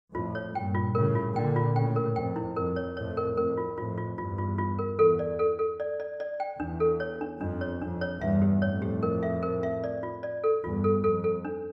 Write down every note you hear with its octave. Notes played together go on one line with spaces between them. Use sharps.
F2 A2 F4
C#5
G2 A#2 G5
F4
A2 C#3 A#4
F4
A#2 D3 G5
F4
A2 C#3 G5
A#4
F2 G5
E4
F2 A#4
C#5
F2 A2 C#5
A#4
F2 A2 A#4
F4
F2 A2 F4
F4
E2 G2 F4
F4
F4
A#4
E2 A4
D5
A4
A4
D5
D5
D5
G5
E2 D4
A4
C#5
D4
F2 D4
C#5
F2 D4
C#5
E2 G2 E5
G4
F2 A2 C#5
G4
A#4
E5
A#4
E5
D5
F4
D5
A4
E2 G2 F4
A4
F2 A4
A4
D4